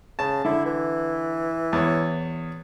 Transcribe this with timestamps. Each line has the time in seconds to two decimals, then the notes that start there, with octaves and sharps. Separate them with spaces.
0.19 C#3 A5
0.45 D3 E4
0.66 E3
1.73 E2 C#5